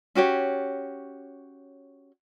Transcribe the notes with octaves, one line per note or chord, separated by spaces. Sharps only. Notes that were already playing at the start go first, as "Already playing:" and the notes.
C#4 F#4 G4 C#5